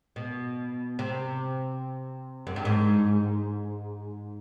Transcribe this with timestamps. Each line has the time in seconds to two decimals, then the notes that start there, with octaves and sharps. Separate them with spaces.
0.16 B2
0.99 C3
2.47 F#2
2.56 G2
2.65 G#2